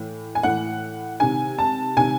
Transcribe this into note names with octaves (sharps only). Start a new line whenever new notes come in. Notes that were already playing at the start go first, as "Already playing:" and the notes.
Already playing: A2 E3
G#5
A2 E3 F#5
C3 D#3 G#5
A5
C3 D#3 G#5